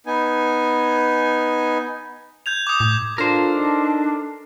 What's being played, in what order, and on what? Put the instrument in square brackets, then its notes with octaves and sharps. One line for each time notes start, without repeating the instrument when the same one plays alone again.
[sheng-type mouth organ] B3 D#4 G#5
[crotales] G6 G#6 F7
D6 D#6
[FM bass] A2
[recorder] D4 [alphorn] F4 [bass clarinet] A4 [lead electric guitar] A#4 C5
[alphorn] D#4